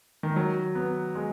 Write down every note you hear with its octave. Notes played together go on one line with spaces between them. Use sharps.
D#3
F#3
B3
G#3